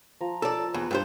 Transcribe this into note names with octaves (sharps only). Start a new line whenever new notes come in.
F3 A#5
A4 D5
E2 B4 E6
G2 A4 C5 A5